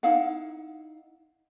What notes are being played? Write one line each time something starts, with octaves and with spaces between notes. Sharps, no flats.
D#4 E4 F5 F#5